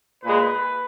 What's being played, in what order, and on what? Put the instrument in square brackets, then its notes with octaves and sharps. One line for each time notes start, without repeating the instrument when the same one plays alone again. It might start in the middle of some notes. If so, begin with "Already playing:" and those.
[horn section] A#2 G#3 B4